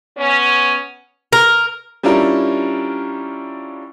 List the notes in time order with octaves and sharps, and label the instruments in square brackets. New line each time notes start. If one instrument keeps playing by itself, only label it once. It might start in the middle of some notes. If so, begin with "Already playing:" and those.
[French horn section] B3 C#4
[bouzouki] A#4
[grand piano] G3 C#4 D4 E4 F4 A#4